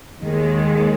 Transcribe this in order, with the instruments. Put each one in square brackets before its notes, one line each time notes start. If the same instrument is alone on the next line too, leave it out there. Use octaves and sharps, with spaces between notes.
[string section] D#2 D#3 G#3